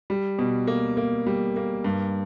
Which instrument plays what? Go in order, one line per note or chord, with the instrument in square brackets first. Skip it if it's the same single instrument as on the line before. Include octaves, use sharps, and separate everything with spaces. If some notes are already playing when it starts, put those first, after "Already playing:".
[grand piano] G3
B2
A#3
A#3
G3
A#3
G2